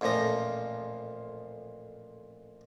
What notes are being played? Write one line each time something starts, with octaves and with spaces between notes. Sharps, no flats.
A1 F2 A#2 F3 A#5